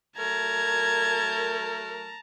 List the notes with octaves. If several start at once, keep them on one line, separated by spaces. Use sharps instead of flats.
F#3 A3 A#4 A5 A#5 G#6